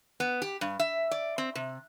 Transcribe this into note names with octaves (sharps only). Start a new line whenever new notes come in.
B3
G4
G2
E5
D5
C4
C3